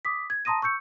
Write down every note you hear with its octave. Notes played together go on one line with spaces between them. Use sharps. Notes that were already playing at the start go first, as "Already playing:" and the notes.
D6 D#6 B6
G#6
A5 A#5 C6 D#6 A#6 D#7
C#6 E6 G6 C#7